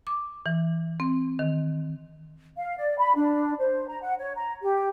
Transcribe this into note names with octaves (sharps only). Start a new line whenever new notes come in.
D6
E3
C4
D#3
F5
D5
B5
D4
C5
A#5
F#5
C#5
A#5
G4